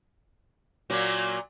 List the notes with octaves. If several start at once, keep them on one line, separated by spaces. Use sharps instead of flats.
A#2 F#3 A#3